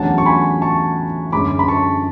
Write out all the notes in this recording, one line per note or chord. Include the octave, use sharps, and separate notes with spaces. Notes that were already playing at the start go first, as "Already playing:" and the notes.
Already playing: E2 C#3 F#3 A3 D4 F#5 A5
C#6
G#5 B5
A5 C#6
F#2 D3 G#3 B5 D6
B5
A5 C#6